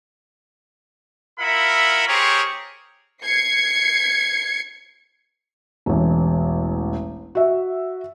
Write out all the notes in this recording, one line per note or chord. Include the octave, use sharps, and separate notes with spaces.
E4 F4 A#4 E5 F#5 B5
C4 G4 G#4 A#4 C5 C#5
G#6 C7 C#7
E1 A1
F#4 E5